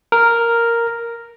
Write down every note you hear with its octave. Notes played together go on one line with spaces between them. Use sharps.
A#4